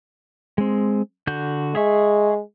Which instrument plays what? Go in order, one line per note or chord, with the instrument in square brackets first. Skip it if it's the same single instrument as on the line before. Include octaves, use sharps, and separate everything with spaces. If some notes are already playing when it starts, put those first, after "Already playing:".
[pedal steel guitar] G#3 C4
D3 F#4 G6
[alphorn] G#3 [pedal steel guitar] G#4 E5 C#6